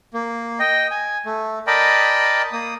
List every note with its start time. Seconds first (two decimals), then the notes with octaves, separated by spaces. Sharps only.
0.14 A#3
0.59 D#5 G5
0.91 G#5
1.26 A3
1.67 A#4 D5 D#5 G5 A5 B5
2.52 A#3 D#6